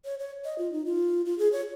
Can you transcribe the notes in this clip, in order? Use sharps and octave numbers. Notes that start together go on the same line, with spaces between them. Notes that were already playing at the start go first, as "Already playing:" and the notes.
C#5
C#5
D#5
F4
D#4
F4
F4
G#4
C#5